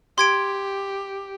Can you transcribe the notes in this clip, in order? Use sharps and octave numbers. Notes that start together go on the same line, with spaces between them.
G4 C6 G#6 D7